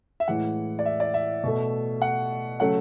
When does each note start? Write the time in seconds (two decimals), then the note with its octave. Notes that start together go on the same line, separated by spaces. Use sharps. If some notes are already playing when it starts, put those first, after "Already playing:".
0.20 E5
0.28 A2 E3 G#3 F#5
0.79 D5
0.85 E5
1.00 D5
1.14 E5
1.44 B2 A3
2.02 F#5
2.60 C#3 F#3 A3 F#5